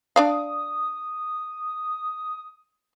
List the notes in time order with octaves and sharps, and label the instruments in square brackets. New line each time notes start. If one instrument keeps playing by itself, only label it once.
[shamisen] D4 D5 F5 [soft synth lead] D#6